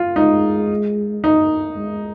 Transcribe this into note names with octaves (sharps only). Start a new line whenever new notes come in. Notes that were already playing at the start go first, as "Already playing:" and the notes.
Already playing: F4
G#3 D#4
D#4
G#3